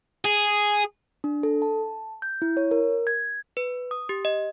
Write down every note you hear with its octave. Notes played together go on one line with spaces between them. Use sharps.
G#4
D4
A4
A5
G6
E4
C#5
A#4
G#6
B4
D#6
G4
D#5